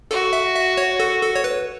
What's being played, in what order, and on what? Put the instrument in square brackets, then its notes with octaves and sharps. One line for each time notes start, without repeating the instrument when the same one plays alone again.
[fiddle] F#4 [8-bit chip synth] A4
[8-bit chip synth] E5
E5
C#5
A4
A4
C#5
B4